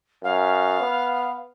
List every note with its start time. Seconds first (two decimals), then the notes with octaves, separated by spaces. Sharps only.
0.24 F#2 F5
0.81 B3